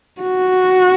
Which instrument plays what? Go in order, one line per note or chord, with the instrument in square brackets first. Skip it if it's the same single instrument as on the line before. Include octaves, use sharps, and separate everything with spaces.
[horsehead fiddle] F#4